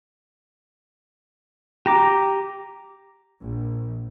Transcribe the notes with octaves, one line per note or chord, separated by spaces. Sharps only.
G4 A#5 D6
A#1